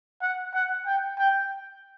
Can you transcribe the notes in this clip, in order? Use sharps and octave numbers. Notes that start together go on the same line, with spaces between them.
F#5
F#5
G5
G5